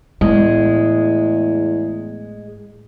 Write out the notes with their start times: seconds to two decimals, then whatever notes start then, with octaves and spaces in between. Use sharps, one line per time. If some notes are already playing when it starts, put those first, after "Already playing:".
0.21 E2 A2 G#3